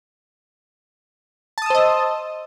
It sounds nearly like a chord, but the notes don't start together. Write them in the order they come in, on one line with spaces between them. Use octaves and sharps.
A5 D#6 E6 C5 D#5